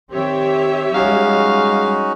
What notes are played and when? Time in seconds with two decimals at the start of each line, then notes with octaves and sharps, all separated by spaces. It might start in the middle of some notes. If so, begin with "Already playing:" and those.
0.11 D#3 C4 G4 C#5 E5
0.94 G3 G#3 C#4 D#4 F#4 F5